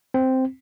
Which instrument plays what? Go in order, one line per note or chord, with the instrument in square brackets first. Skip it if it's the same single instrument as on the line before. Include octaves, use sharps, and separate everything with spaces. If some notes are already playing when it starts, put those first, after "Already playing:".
[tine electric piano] C4